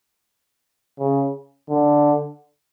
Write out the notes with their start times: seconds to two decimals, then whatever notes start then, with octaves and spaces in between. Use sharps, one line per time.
0.99 C#3
1.69 D3